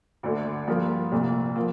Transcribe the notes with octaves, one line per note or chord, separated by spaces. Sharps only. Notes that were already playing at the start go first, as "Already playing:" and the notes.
D2 D3 A3
G2 F3 A#3 F4 A#4
C2 A#2 F3 A3
F3 A#3